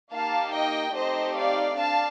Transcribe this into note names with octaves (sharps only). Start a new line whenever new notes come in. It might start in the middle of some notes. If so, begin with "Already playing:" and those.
A#3 D#4 G4 F5 A5
D#5 G5
A3 C4 D#4 G4 C5 D#5
D5 F5
D4 F5 A5